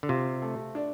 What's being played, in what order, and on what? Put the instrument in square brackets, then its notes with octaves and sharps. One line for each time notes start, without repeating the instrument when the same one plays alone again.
[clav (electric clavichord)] D3
[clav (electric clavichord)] C3 [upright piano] F4
[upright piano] A3
D4